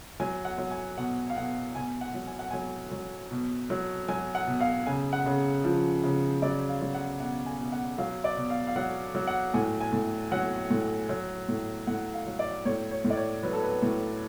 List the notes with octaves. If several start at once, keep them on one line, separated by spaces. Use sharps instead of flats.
F#3 G#5
F#5
F#3
G#5
B2 F#5
F5
B2 F#5
B2 G#5
F#5
F#3
G#5
F#5
F#3 G#5
F#3
B2
F#3
F#3 G#5
F#5
B2
F5
C#3 G#5
F#5
C#3
F3
C#3
F#3 D5
F5
F#3
F#5
B2 F#5
G#5
B2
F#5
F#3 F5
D5
B2
F5
F5
F#3 F#5
F#3
F#5
A2 G#5
G#5
A2
F#3 F#5
A2
F#3
A2
A2 F#5
F5
F#3
D5
A2 C#5
C#5
A2
D5
C#5
F#3 B4
A4
B4
A2